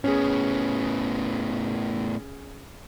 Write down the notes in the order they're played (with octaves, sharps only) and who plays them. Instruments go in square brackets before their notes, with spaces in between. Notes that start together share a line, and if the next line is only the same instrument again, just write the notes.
[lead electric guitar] A2 B3 [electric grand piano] C#4 G#4